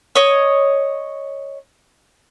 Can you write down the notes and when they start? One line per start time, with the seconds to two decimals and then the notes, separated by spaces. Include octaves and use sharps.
0.15 C#5 D#5